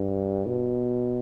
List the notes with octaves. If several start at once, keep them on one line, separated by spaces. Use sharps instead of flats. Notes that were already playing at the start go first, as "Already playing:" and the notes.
Already playing: G2
B2